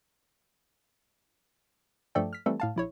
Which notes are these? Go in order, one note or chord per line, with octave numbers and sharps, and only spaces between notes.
G2 F3 A3 A4 D5 G5
F6 B6
E3 G3 A3 C4 A4
A2 F5 A5
A#1 E4 C#5